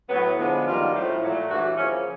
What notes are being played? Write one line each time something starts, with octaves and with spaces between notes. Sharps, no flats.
A2 F#3 B3
D3 F3 G#3 B3
F#2 D#3 G3 A#3 F4
A2 F3 A3
A#2 F#3 A3
G2 E3 A3 F#4
C#3 F3 A#3 C#4